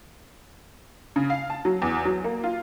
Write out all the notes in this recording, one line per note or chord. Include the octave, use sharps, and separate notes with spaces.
C#3
F5
A5
F#3
E2
F#3
A#3
F4